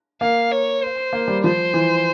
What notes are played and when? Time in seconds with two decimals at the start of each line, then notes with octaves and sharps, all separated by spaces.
0.21 A#3 F5
0.52 C#5
0.82 C5
1.13 A#3
1.28 G3
1.43 F3 C5
1.74 E3